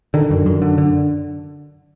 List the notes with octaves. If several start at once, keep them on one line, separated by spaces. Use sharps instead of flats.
D3 D#3
F#2
F#2
D3
D3